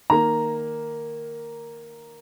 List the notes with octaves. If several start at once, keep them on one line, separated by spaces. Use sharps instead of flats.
D#3 A#3 A#5